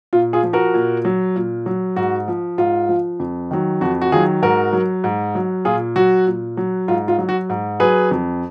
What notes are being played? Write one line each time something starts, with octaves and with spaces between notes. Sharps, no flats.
A#2 F4
F4 G#4
F3
F#4 A#4
A#2
F#3
A#2
F#3
G#2 F#4
F3
G#2 F4
F3
F2
D#3 F#3
F2 F#4
F#4
D#3 F#3 F4 G#4
G#2 F#4 A#4
F#3
G#2
F#3
A#2 F4 G#4
F#3 F#4
A#2
F#3
G#2 F4
F4
F#3
F#4
G#2
F#3 G#4 B4
F2